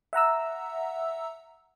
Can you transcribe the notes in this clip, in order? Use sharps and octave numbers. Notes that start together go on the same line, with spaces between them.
E5 F#5 A#5 E6